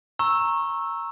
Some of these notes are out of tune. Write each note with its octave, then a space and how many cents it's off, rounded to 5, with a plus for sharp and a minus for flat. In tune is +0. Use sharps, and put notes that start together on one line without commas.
A#5 +0 C#6 -20 E6 +0